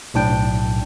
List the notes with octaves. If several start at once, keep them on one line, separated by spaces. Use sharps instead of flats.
B1 A2 D4 G5